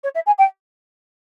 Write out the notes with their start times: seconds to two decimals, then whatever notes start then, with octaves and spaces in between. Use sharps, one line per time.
0.04 C#5
0.15 E5
0.26 G#5
0.38 G5